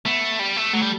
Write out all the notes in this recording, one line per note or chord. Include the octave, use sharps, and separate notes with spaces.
A3 B3
G3
A3
F#3 A3
G3